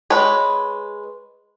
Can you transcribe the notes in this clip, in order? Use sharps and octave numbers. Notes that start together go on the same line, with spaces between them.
G#3 B4 C#5